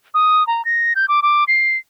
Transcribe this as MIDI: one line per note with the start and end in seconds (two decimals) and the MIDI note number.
0.14 0.46 87
0.47 0.64 82
0.65 0.93 94
0.95 1.05 91
1.08 1.20 86
1.22 1.44 86
1.48 1.77 96